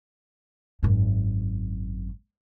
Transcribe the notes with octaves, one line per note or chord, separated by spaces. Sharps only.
G#1 F#2